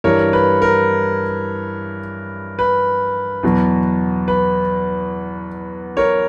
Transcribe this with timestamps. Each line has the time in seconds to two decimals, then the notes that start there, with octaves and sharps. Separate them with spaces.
0.04 G2 E3 G3 A#4 C#5
0.33 B4
0.62 A#4
2.59 B4
3.43 E2 B2 F#3
4.28 B4
5.97 A#4 C#5